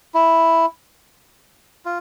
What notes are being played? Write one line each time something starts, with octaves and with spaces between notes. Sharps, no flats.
E4
F4